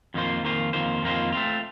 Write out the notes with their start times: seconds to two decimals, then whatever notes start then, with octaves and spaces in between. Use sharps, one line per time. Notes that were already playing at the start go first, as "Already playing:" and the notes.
0.14 F2 D#3 A#3 F4 C5
0.43 F2 D#3 A#3 F4 C5
0.73 F2 D#3 A#3 F4 C5
1.02 F2 D#3 A#3 F4 C5
1.32 A3 C4 F4